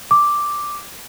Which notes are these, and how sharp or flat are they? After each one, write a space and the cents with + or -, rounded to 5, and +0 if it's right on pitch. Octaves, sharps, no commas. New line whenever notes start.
D6 +0